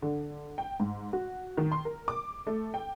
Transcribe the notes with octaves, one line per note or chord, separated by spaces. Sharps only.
D3
G5
G#2
F#4
D#3
C6
A#4
D6
A3
G5